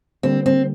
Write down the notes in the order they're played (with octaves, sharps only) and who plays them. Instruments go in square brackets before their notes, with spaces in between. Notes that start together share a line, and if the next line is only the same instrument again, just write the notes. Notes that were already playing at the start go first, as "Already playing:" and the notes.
[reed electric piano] D3 G3 A#3 [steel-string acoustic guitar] C4
[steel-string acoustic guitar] C4